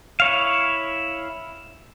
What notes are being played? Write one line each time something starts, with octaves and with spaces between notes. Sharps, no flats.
E4 C#5 F5